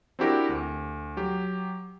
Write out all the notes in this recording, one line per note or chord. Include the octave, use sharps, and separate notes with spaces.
C4 D4 E4 F#4 G4 A#4
D2
F#3 G4